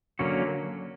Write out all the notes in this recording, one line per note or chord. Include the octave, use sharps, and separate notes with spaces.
D3 F#3 A#3 C#4 F#4